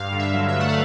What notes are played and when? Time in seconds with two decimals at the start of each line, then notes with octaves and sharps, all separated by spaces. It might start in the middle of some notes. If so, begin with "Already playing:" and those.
Already playing: G2 F5
0.12 D3
0.19 E5
0.34 F#3
0.48 E5
0.56 A3 F#5
0.69 F5